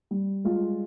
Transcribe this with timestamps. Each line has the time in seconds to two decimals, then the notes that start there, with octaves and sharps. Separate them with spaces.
0.11 G3
0.45 G#3 F4